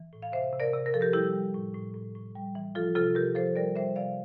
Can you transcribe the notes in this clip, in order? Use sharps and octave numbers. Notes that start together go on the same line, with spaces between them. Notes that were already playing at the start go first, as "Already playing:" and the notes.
Already playing: E3
A2
F5
C3 C5 E5
C3
A#4 D5
C3
A#4
F3 A4
G4 A#4
G3 E4 G4
G3
A2
A2
A2
A2
G3
E3
F3 F4 A4
C3 F4 A4
C3 G4 A#4
F3 A4 C5
G3 A#4 D5
G3 C5 E5
C3 D5 F5